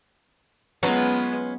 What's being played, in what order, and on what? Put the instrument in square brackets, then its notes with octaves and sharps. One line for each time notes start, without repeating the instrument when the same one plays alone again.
[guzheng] F#3 [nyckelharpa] G#3 B3 [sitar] C#4 F4 B4